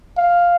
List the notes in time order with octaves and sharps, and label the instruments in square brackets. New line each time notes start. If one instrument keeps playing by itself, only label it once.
[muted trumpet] F5